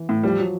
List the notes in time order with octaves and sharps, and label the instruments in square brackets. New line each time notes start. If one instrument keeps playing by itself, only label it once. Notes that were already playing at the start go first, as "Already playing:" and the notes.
Already playing: [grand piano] E3
[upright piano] A2
[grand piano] F3 [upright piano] G3
[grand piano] F#3